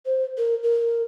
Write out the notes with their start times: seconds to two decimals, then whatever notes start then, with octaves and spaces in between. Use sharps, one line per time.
0.06 C5
0.37 A#4
0.63 A#4